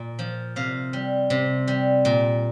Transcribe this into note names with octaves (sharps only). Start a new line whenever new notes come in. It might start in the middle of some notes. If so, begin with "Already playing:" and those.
Already playing: A#2
F3
C3 F5
G3
C3
G3
A#2